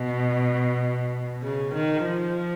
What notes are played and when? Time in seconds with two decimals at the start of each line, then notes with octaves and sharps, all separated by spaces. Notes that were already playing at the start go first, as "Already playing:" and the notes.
Already playing: B2
1.42 C#3
1.74 D#3
2.05 F3